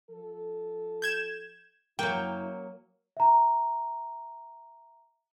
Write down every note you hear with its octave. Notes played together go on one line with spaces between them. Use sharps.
F3 A4
G6 G#6 E7
F#2 C#3 F#3 A#3 E4 G5
E5 A#5